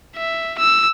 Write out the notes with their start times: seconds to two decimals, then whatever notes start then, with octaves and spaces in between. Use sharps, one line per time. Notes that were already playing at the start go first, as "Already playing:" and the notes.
0.16 E5
0.59 E6